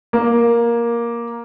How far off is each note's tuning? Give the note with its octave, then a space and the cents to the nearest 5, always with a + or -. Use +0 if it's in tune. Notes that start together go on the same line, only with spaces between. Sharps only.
A#3 +10